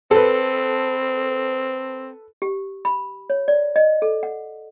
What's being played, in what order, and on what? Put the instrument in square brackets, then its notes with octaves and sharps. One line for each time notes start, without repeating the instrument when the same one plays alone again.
[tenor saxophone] C4 [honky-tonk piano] A4 B4
[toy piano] G4
B5
C#5
D5
D#5
A4
F#5